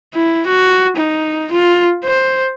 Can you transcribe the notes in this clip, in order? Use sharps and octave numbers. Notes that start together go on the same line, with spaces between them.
E4
F#4
D#4
F4
C5